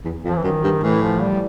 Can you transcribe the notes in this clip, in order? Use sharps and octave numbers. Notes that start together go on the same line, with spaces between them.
E2
F2
F3
E3
F#2 D#3
G2
A2 E3
F3
G3